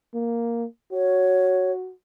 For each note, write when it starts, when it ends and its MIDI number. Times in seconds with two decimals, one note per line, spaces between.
0.14 0.65 58
0.92 1.92 66
0.92 1.72 73